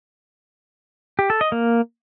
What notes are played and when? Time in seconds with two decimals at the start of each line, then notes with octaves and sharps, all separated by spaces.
1.19 G4
1.30 A4
1.41 D#5
1.52 A#3